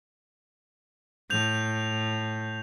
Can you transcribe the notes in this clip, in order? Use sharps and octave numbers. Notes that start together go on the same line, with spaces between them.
A2 G6 F7